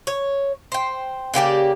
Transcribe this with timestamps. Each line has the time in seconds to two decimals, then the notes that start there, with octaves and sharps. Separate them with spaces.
0.07 C#5
0.72 C5 G5
1.34 C#3 A#3 G4 D5